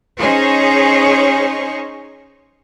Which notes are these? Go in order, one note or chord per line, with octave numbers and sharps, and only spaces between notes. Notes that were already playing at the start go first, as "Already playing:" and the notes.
C#4 D#4 G#4 C5 C#5